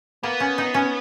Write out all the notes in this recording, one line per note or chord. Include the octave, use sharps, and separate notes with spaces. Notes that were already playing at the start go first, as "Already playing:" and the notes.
A#3 B3
C#4
D#4
C#4